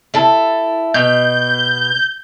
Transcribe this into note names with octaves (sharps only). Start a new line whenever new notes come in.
E4 A4
B2 G6